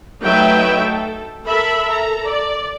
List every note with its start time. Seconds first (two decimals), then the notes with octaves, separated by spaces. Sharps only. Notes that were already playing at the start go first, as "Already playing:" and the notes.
0.21 F#3 A3 D#4 B4 E5 G5
0.81 A4
1.44 A4 A#4 E5 B5
1.87 A4 A#5
2.24 D5